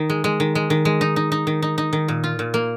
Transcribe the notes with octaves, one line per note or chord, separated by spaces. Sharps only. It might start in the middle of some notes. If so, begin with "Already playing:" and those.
Already playing: D#3 D#4
G#3
G#3
D#3
G#3
D#3
G#3
D#4
D#4
D#4
D#3
D#4
D#4
D#3
A#2
F4
A#2
A#3